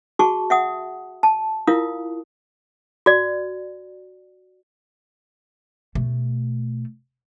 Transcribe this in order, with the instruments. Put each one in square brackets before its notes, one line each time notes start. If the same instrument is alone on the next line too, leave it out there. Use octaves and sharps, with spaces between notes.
[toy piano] F#4 G#4 A5 C#6
E5 F#5 D#6
A5
E4 F4 A#4 F5 D#6
F#4 D5
[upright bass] B2 A3